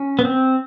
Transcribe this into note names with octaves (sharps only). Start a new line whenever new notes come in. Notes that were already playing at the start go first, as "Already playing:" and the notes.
Already playing: C#4
B3
C4